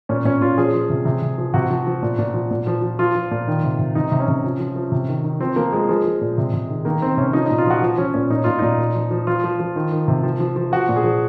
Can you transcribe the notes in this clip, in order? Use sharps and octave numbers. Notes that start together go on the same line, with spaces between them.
A#2 C#4
A#2 C#4
A#2 F4
F3 G#4
F3
C3
C3
C3
F3
C3 F#4
F3
F3
A#2
A#2
F3
A#2
F3
F3
F3 F4
F3
A#2
D#3
C3
C3
C3 D#4
C3
C#4
C3
F3
F3
F3
C3
D#3
D#3
F3 C4
F3 A#3
F3 G#3
F3 G#3
F3
A#2
C3
C3
D#3
D#3 A#3
D#3 C4
C3 C#4
F3 D#4
D#4
A#2
F4
F3 F#4
F3
F3 C#4
A#2 C#4
A#2 D#4
A#2 F4
A#2 D#4
A#2
F3
F3
F3 F4
F3
F3
D#3
D#3
C3
F3
F3
F3
F3 F#4
A#2
G#4
F3